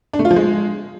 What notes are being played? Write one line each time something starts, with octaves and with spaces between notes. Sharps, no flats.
D4
A3
F4
F3
G#3